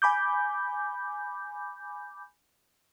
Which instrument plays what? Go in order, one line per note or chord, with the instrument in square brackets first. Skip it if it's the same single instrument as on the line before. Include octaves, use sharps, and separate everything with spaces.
[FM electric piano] G#5 B5 D6 G6